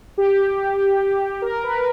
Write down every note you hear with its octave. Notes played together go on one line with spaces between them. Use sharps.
G4
A#4
B4